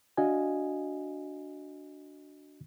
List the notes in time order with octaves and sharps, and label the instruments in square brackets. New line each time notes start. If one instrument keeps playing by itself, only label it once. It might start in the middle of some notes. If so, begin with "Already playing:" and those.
[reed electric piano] D4 F#4 D#5 F5 G#5